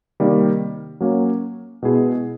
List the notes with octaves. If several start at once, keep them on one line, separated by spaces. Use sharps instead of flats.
C3 D#3 G3 A#3
F#3 A#3 C#4
B2 G#3 B3 E4 G#4